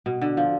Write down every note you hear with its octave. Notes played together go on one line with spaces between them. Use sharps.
B2
D3
F3